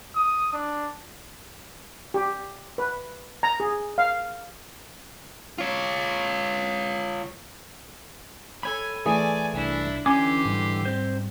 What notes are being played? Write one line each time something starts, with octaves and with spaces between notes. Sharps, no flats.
D#6
D4
G4
B4
A#5
G#4
F5
F4 C#5
A4 C#5 G#5 B5
E3 A3 G#4 D5 G#5
C2 D4 E4
D3 E3 C#4 G4 G#5 C6 D6
G#2 G3
C4 C5